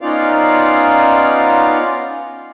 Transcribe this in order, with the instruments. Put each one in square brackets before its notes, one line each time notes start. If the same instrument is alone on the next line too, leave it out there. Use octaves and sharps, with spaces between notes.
[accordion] B3 C#4 D#4 F4 D5 F5